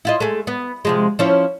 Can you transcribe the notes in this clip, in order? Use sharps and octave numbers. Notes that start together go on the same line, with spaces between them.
E4 F4 D#5
G#3 A3
B3
C3 F3 G#3
F3 C#4 E4